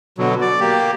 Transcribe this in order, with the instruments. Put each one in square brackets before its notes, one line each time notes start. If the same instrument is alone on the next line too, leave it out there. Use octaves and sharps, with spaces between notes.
[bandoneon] B2 D3 F#3
D5
A#3 G4